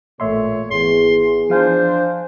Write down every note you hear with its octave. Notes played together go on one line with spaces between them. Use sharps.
A1 A#2 A3 C#5 E5 C6
G#1 E2 G#4 C6
F3 D4 C5 F5 G#5